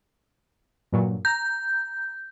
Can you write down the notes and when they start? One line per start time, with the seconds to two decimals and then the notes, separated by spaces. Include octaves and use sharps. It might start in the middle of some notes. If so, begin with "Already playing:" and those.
0.92 G2 A#2 F#3
1.25 A#5 G6